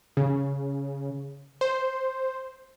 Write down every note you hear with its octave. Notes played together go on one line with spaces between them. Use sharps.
C#3
C5